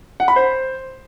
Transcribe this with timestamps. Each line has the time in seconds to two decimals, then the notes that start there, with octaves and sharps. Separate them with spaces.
0.20 F#5
0.28 B5
0.36 C5